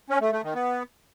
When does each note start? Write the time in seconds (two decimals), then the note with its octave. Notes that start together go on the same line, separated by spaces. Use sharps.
0.10 C#4
0.21 A3
0.32 A3
0.43 D#3
0.55 B3